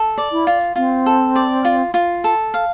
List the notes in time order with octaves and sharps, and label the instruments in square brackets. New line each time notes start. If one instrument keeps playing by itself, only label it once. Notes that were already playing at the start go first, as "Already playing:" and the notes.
Already playing: [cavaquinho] A4
D5
[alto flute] E4
[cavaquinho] F4
[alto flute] C4 [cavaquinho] F4
[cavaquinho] A4
D5
F4
F4
A4
F5